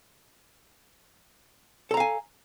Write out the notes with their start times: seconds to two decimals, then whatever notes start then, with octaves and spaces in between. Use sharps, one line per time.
1.91 A4
1.94 A#5
1.97 F5
2.00 G#5